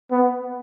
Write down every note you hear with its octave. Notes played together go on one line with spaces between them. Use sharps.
B3